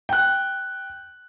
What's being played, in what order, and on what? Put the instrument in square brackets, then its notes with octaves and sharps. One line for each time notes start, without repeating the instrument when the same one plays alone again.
[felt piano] G5 F#6